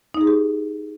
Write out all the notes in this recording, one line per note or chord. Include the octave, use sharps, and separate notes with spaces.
D#4
G#4
G4